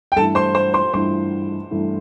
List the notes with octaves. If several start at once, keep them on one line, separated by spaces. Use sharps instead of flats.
G5
G2 E3 A3 E4 A4 A5
C5 C6
C5 C6
C5 C6
G2 E3 A3 E4 C5 C6
G2 E3 A3 E4